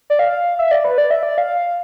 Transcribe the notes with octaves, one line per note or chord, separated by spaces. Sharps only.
D5
F5
E5
D5
B4
D5
E5
D5
F5